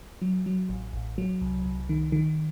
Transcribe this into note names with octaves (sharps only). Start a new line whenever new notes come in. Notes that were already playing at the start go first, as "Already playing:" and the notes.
F#3
F#3
A1
A1
F#3
C2
C2
D#3
D#3